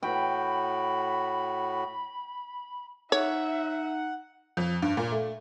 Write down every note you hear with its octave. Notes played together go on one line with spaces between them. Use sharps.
A2 F#4 G5 B5
D#4 C#5 E5 F#5
F2
G2
A#2
A3